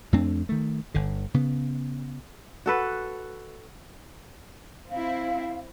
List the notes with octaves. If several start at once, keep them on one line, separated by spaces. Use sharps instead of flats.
F2 A3 C4 D4
D#3 A3
G1 D3
C#3 B3
F#4 A4 B4
C4 E4 F5